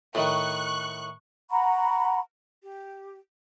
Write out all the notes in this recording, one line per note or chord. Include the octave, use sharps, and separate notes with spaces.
A2 D#3 C#6 F#6
F#5 A#5 B5 C#6
G4